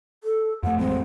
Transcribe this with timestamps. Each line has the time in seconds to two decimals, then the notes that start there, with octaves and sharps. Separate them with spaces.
0.24 A4
0.63 F2 A3 F#5
0.78 A1 F#3 G#3 C4